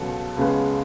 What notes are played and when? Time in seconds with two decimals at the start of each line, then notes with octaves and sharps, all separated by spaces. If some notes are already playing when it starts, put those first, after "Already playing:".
Already playing: C#2 B2 F#3 A4
0.37 C#2 C#3 G#3 B3